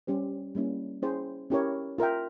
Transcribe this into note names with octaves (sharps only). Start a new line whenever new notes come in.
G3 C#4 G4 C5
G3 A#3 C#4 E4
C#4 E4 G#4 C5 G5
C#4 E4 G4 A#4 C#5
F4 A#4 E5 G5